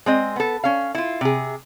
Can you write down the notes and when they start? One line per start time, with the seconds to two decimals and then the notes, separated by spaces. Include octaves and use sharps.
0.06 G#3 C4 D#5
0.36 B3 A4
0.64 C#4 F5
0.95 E4 F4
1.21 C3 G#4